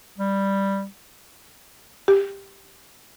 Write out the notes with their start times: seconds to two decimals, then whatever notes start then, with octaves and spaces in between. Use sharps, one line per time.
0.18 G3
2.08 G4